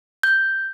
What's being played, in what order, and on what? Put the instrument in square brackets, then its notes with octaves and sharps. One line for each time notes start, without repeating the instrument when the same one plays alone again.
[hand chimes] G6